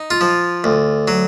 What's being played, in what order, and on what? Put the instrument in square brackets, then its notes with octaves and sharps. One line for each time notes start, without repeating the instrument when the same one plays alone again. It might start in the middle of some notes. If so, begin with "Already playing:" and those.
Already playing: [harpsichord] D#4
F4
F3
D2
F#3